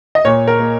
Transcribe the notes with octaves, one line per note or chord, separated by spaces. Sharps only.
D#5
A#2 C#5
A#4
A#3